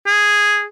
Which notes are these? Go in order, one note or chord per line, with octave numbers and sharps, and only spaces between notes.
G#4